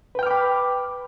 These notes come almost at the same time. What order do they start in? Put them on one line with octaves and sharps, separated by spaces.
B4 G5 F6 D6 B5